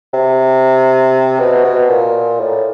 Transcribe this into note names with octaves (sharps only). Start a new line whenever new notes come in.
C3
B2
B2
A#2
A2